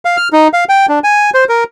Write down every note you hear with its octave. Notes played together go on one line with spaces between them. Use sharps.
F5
F6
D#4
F5
G5
D4
G#5
C5
A#4